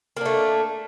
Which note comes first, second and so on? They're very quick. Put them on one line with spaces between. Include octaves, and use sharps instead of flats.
A#3 D4 A3